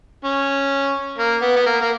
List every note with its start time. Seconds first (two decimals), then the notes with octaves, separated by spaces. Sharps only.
0.24 C#4
1.18 A#3
1.42 B3
1.56 B3
1.66 A#3
1.81 A#3